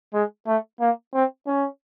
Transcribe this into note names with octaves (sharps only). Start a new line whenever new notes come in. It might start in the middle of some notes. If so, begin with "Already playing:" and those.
G#3
A3
A#3
C4
C#4